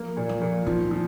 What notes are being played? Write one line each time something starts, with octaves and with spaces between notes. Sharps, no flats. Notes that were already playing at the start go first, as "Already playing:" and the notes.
Already playing: F3 A#3
A#2
F3
A#2
D#3 F3
F3